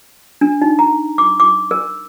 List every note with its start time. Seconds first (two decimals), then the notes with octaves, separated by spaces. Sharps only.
0.41 D4
0.62 D#4
0.79 A#5
1.18 D6
1.40 D6
1.71 A#4